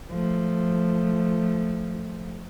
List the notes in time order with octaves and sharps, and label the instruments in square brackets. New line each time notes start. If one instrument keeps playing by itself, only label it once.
[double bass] F3 A3